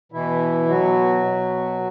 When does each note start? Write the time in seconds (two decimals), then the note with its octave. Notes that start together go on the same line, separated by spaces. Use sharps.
0.12 B2 E3 E4
0.69 B2 F#3 F#4
1.25 B2